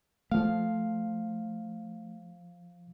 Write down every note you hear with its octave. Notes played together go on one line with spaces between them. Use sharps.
F3 A3 F5